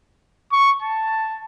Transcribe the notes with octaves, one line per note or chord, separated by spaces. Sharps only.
C#6
A5